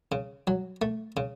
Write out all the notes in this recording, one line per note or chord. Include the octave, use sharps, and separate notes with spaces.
C#3
F#3
A3
C#3